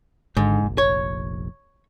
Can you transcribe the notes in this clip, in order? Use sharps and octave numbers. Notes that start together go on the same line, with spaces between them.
G#1 G#2 D3
F1 A#1
C#5